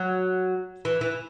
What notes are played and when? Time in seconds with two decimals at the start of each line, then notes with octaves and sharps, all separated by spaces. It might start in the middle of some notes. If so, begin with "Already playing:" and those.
Already playing: F#3
0.85 E3
1.01 E3